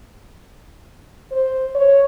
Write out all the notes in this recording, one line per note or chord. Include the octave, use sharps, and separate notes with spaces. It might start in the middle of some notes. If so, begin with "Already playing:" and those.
C5
C#5